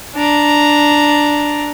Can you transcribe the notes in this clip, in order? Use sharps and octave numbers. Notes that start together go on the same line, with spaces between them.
D4 A#5